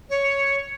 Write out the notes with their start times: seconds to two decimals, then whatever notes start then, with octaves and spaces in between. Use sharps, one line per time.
0.10 C#5